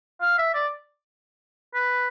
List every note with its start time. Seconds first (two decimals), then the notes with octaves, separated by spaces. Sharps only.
0.21 F5
0.38 E5
0.54 D5
1.75 B4